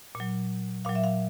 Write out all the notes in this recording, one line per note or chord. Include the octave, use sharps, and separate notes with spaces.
A#2
F#3
A#2 F#3 F5
E5
F5